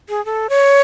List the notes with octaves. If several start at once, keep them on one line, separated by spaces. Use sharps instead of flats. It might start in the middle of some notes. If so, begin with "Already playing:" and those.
G#4
A4
C#5